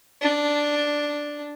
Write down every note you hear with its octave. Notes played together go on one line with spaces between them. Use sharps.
D4